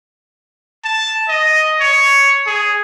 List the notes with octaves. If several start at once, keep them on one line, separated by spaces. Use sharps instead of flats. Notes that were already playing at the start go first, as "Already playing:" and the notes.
A5
D#5
C#5
G#4